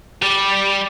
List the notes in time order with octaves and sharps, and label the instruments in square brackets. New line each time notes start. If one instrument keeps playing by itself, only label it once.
[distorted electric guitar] G3